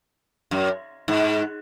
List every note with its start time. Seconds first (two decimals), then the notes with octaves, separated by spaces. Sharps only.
0.51 F#2
1.08 G#2